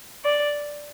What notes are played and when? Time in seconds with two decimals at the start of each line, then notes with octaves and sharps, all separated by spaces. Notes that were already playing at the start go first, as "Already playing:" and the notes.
0.24 D5